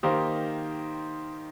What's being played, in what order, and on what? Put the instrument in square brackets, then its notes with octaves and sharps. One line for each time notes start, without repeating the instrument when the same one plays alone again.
[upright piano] D#3 A#3 D#4 G4 C5